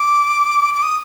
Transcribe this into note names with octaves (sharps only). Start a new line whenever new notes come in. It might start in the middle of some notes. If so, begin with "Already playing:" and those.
Already playing: D6
D6
D#6